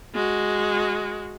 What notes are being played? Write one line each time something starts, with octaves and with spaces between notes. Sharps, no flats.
G#3 F#4